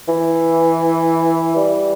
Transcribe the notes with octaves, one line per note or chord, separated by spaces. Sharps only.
E3
G3